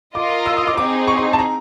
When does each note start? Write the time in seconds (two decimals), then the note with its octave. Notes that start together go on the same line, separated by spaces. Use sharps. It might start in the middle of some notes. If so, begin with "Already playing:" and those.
0.15 F4 A#4 D#5 D6
0.46 E6
0.57 D#6
0.67 D6
0.77 C4 D#4 G#4 D6
1.08 C#6
1.17 C6
1.33 A5
1.39 A#5